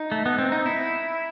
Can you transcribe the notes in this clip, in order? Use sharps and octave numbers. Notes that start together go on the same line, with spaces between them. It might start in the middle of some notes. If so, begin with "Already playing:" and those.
Already playing: D#4
A3
B3
C4
D#4
E4